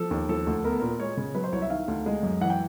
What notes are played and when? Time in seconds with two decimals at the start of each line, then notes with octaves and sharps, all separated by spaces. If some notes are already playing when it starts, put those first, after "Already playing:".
Already playing: F3 A4
0.11 D#2
0.29 F3 A4
0.47 D2
0.64 B3 A#4
0.71 A4
0.79 A#2 A#4
0.99 G#3 C#5
1.17 C#3
1.35 F#3 B4
1.44 C5
1.52 C2 C#5
1.62 E5
1.70 D#3 F5
1.88 D2
2.06 G#3
2.23 F#2
2.41 E3 F#5
2.50 G5